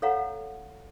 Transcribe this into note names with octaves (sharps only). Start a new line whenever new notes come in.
A4 C#5 F5 F#5 A#5